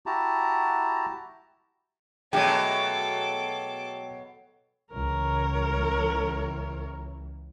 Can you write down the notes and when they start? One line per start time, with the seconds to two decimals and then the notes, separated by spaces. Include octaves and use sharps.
0.06 E4 F#4 G4 A5 A#5
2.33 B2 F#3 G#3 A3 G4 A4 G5 D6
4.93 C#2 E3 A#4 C#5